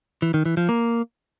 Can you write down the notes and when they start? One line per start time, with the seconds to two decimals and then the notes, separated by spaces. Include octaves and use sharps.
0.22 E3
0.34 D#3
0.45 E3
0.57 F3
0.69 A#3